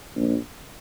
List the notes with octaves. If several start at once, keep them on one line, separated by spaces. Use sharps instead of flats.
A#1